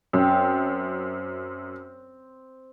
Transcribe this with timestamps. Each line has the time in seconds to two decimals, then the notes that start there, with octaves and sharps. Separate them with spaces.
0.13 F#2 C4